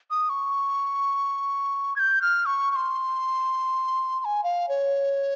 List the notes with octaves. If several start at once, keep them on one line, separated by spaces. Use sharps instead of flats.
D#6
C#6
G#6
G6
F6
C#6
C#6
C6
C6
G#5
F5
C#5